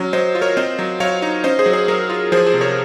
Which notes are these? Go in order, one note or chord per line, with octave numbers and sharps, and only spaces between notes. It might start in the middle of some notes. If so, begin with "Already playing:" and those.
Already playing: F#3 C#4
F#3 C5 D#5
F4
A#4 C#5
C4 C5 D#5
F#3
F#3 C#5 F5
D#4
C#4 C5 D#5
G#4 C5
F#3
G#4 C5
F#3 A#4 C#5
F4
F3 G#4 C5
G#4 C5
C3
A#4 C#5